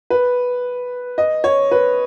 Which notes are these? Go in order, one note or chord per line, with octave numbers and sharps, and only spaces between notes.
B4
D#5
C#5
B4